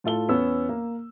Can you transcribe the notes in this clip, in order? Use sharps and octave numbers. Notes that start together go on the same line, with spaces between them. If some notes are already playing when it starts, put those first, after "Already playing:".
A2 F4 A4 G7
E2 B3 C#4 E6
A#3